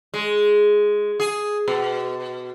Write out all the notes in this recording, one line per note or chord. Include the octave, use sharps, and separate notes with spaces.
G#3
G#4
B2